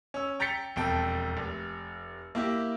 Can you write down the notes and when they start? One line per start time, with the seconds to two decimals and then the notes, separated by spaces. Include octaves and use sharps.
0.14 C#4 E6
0.40 G5 A#5 G6 A6 B6 C#7
0.76 E1 F2 G5 A5
1.37 F1
2.35 A#3 E4 G4